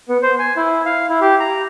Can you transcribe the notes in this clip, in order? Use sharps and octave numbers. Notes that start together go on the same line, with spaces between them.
B3
C5
G#5
E4
F5
E4
G4
A#5